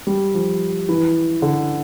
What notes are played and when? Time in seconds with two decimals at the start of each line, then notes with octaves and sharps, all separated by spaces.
0.07 G3
0.34 F3
0.89 E3
1.42 D3